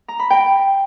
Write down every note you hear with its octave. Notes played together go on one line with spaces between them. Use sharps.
A#5
B5
G5